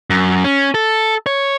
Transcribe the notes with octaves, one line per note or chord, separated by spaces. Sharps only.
F#2
C#4
A4
C#5